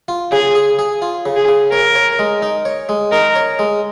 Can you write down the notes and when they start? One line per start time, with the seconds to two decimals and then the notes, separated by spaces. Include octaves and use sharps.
0.08 F4
0.32 C#3 G#4
0.55 G#4
0.79 G#4
1.02 F4
1.26 C#3
1.36 G#4
1.48 C#3
1.72 A#4 C#5
1.95 C#5
2.19 G#3
2.42 D#4
2.65 C#5
2.89 G#3
3.12 D#4 A#4
3.35 C#5
3.59 G#3